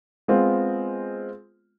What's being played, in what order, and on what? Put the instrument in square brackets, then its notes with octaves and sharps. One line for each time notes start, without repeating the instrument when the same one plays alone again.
[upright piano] G#3 B3 C4 F4